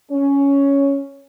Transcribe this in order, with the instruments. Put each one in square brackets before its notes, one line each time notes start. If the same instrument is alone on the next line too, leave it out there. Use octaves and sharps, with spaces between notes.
[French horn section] C#4